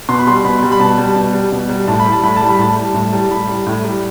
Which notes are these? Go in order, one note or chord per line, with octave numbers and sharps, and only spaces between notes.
B2 C6
B5
G3 C6
B2 B5
G3
B5
B2 A5
G3
B2
G3
B2
G3
A2 A5
B5
G3
A5
A2 B5
G3 A5
B5
A2 A5
G3
A2
G3
A2 B5
G3
A2
G3